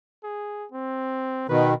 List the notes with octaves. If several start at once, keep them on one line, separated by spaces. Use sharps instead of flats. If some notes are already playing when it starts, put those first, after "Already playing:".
G#4
C4
B2 D#3 B4